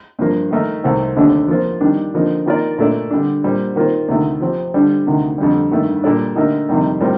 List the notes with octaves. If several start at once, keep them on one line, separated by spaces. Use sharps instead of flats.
G2 F3 A#3
D#3 A3 D#4 A#4
C2 C3 D#3 A3 C4
D#2 D3 A3 D4 G4
F3 A#3 F4 C5
D#3 G3 D4
D3 F3 A#3 D#4
D#3 A#3 F4 A#4 D5
A#2 A3 D4 A4 D5
D3 G3 D4
A#2 G3 C4
D#3 A#3 F4 C5
D2 C3 D#3 A3
F3 C4 G4
D3 G3 D4
D2 C3 D#3
F2 D3 G3
G2 D#3 A3
A#2 G3 D4 A4 D5
D3 A3 D#4 G4 A#4
F2 C3 D#3 G3
A2 G3 C4 F4 A#4